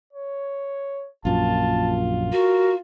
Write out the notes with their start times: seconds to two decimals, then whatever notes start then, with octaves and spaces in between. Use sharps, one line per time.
0.13 C#5
1.25 A#1 F#2 A#2 F4 A5
2.32 F#4 A#4